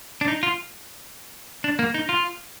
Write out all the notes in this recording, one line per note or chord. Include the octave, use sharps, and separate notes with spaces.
D4
D#4
F4
D4
A#3
D#4
F4